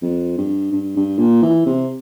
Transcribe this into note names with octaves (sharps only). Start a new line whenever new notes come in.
F2
G2
G2
G2
A#2
E3
C3